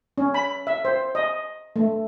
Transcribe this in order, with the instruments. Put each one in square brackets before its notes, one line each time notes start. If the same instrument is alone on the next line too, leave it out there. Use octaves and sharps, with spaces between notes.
[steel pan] C#4
B5
E5
C5
D#5
A3